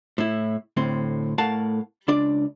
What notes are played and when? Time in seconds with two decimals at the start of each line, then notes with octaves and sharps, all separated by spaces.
0.18 A2 E4
0.77 D2 A2 C4
1.38 A2 A3 A#4 F5 F#5 A5
2.08 C#2 D4 D5